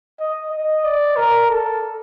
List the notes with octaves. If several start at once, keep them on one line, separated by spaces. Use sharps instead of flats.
D#5
D#5
D5
A#4
A4